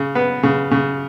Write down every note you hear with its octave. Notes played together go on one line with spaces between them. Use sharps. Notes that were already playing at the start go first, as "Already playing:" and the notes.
Already playing: C#3
B3
C#3
C#3